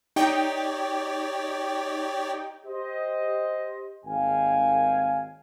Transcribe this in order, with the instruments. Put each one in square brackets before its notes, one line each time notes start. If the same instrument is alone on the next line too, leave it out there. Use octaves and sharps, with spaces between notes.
[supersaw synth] D#4 G5 [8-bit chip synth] G4 C#5 D5
[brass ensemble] G4 C5 D#5
G#1 D#2 F5 G5 G#5